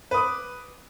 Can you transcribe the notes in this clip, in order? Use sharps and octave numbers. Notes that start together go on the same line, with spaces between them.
B4 D6 D#6